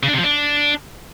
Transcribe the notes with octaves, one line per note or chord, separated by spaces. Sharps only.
C#3
D4
C3
F3
D4